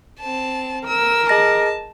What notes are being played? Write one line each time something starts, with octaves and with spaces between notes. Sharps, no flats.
C4 A5
A#4 E6
G#4 D#5 A5 A#6